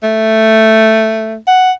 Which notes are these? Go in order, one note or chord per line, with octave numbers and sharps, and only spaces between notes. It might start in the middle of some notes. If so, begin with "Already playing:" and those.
A3
F#5